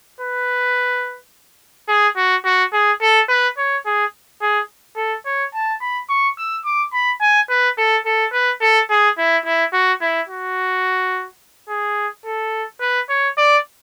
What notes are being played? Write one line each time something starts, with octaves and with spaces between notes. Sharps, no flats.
B4
G#4
F#4
F#4
G#4
A4
B4
C#5
G#4
G#4
A4
C#5
A5
B5
C#6
E6
D6
B5
G#5
B4
A4
A4
B4
A4
G#4
E4
E4
F#4
E4
F#4
G#4
A4
B4
C#5
D5